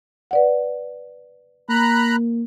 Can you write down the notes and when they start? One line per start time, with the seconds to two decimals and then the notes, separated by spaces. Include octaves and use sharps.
0.31 B4 D5 F#5
1.69 A#3 A#5 B5 F#6